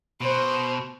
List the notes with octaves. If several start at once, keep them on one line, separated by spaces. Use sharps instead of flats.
B2 C5